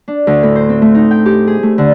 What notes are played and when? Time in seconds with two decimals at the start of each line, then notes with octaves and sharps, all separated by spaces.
0.08 D4
0.27 D2
0.43 A2
0.56 C5
0.69 C4
0.82 A3
0.95 D#4
1.11 G5
1.26 G4
1.47 G#4
1.63 A3
1.78 D3